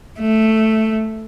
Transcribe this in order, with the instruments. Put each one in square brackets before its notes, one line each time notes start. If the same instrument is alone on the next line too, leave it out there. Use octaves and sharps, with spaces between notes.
[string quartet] A3